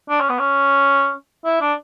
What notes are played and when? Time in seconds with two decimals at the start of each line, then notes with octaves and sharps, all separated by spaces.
0.09 D4
0.20 C#4
0.30 B3
0.39 C#4
1.45 E4
1.61 D4